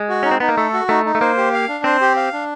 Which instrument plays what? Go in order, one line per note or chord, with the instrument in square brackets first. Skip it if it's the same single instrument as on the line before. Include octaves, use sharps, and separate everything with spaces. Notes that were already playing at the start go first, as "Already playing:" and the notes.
Already playing: [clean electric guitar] G#3
[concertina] F#4
[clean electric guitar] C#4 [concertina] D#4
[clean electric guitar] C4
[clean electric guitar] B3 [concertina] D#4
[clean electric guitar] A#3
[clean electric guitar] A3 [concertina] A4
[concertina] F#4
[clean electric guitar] A3 [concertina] D#4
[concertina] D#4
[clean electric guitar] A3
[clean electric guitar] A#3 [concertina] C5
[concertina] G4
F5
D4
[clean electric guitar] C4 [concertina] C5
[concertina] G4
F5
D4